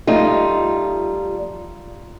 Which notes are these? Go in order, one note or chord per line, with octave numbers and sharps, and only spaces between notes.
F3 G3 A3 D#4 F4